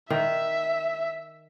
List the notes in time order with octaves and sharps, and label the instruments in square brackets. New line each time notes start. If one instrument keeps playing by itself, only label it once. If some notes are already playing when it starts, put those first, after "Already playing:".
[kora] D#3 [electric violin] E5